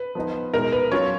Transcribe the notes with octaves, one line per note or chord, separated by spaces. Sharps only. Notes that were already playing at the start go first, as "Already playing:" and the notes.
Already playing: B4
F3 B3 D#4
B2 G#3 D#4 A#4
B4
F#3 C#4 F4 C#5